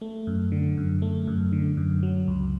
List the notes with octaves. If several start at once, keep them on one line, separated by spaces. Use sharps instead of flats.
A3
F#2
D3
F#2
A3
F#2
D3
F#2
F#3
C#2